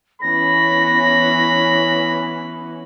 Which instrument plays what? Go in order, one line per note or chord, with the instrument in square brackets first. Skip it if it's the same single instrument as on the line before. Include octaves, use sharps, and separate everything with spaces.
[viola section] E3 B3 C#4 [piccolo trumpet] B5 [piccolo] A#6